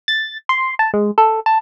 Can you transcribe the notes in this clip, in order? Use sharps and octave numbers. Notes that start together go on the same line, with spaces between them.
A6
C6
A5
G#3
A4
A5